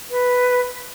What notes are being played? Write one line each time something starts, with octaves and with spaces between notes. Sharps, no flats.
B4